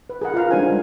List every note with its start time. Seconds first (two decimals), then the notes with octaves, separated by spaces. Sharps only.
0.10 B4
0.22 G#4 A#4 F#5
0.34 F4 A#4 F5 A#5
0.51 G3 G#3 D4 D#4 C5 G#5
0.63 D4